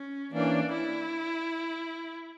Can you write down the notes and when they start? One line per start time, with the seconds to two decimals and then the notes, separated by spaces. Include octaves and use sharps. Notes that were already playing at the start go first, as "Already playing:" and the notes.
Already playing: C#4
0.32 E3 A#3 C#4 D4
0.73 E4